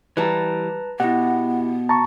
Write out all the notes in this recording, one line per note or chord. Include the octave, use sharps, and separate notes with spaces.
E3 G3 B4 A5 A#5
B2 B3 E4 G4 F#5
A5 A#5 C#6